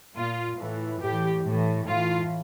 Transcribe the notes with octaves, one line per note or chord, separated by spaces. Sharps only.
A#2 F4
A2 E3
A2 E3 G4
A2 E3
A2 E3 F4